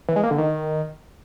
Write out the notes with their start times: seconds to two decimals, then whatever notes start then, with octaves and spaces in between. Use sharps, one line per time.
0.09 E3
0.16 G#3
0.23 A#3
0.31 D3
0.38 D#3